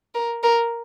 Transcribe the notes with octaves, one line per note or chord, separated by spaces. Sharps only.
A#4
A#4